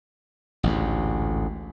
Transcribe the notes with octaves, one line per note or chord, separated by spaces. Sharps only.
A1 D2 G#2